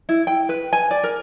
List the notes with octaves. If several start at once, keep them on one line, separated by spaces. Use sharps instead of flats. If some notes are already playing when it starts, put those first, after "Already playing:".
E4
G5
B4
G#5
D5
A#4